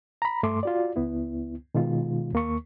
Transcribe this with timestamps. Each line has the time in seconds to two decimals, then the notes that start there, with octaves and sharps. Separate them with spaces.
0.22 A#5 B5
0.43 G2 A3 C6 D6
0.63 F4 F#4 D5
0.96 C#2 B3 E4
1.75 B2 D#3 G#3 F4
2.33 D#2 A#3 C#6